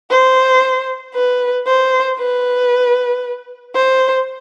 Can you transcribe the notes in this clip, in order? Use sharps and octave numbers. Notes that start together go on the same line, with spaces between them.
C5
B4
C5
B4
C5